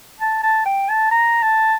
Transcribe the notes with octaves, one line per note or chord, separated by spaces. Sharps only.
A5
A5
G5
A5
A#5
A5